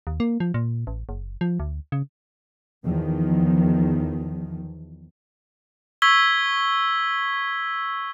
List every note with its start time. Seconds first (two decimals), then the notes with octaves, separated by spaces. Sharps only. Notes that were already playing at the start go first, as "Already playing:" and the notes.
0.07 D#2
0.20 A#3
0.40 F3
0.54 A#2
0.87 A1
1.09 F#1
1.41 F3
1.60 D2
1.92 C#3
2.83 E2 D#3 F3
6.02 C#6 E6 G#6 B6 G7